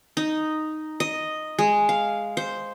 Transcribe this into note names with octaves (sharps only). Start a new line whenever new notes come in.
D#4
D#5
G#3
F5
C5